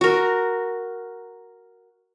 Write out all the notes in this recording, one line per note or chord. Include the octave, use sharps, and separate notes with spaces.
F#4 A#4